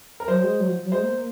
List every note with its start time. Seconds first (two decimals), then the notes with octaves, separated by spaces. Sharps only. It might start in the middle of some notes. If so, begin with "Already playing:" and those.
0.20 A#4
0.28 F#3 C5
0.44 G#3
0.60 F#3
0.68 F3
0.84 F#3
0.92 G#3 C5
1.03 A#3
1.14 A#3